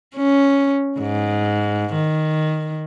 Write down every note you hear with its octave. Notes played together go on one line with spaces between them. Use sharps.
C#4
G#2
D#3